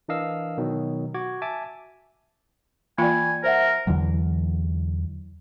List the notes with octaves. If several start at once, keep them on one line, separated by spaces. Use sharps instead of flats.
E3 D4 A#4 D#5 F5 E6
B2 D#3 F#3
F#4 D6 G#6
E5 G#5 A5 D6
E3 A#3 F4 D5 G5 G#5 B5
A#4 C5 E5 F#5
E2 D3 E3 F#3